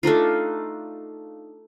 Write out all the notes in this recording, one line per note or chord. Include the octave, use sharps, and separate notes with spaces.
A3 D4 D#4 F4